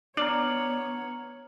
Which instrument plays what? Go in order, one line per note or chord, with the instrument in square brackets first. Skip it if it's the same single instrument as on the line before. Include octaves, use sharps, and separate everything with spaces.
[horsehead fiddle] B3 C#5 [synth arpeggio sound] D4 [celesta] A#5 F6 F#7